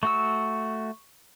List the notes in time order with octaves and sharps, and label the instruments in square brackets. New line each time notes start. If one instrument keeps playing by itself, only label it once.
[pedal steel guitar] A3 F#4 E6 [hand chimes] C#6